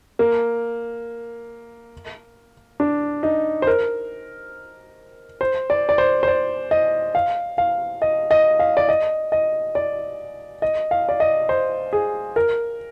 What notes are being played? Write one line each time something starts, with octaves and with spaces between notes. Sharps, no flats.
A#3
D4
D#4
C5
A#4
C5
D5
D5
C5
C5
D5
D#5
F5
F5
D#5
D#5
F5
D5
D#5
D#5
D5
D#5
F5
D5
D#5
C5
G#4
A#4